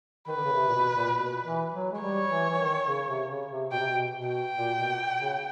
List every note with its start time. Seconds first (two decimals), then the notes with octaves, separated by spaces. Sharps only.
0.28 D#3 B4
0.36 D3
0.44 C#3
0.53 C3
0.68 A#2
0.74 B2
0.95 A#2
1.16 B2
1.44 E3
1.73 F#3
1.92 G#3
2.01 G3 C#5
2.29 E3
2.50 E3
2.58 D#3
2.86 C#3
3.08 C3
3.29 C#3
3.50 C3
3.71 B2 G5
3.79 C3
3.87 B2
4.14 B2
4.28 G5
4.56 A#2
4.78 B2
5.20 C#3